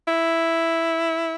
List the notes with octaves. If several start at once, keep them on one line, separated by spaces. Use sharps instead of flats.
E4